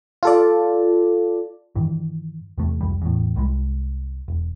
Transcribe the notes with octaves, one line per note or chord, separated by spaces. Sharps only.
F4 A4 D5
G2 D#3 E3
E2 C3 A3
F#1 C2 F2 G3
E2 A2
C2 G3 G#3
E1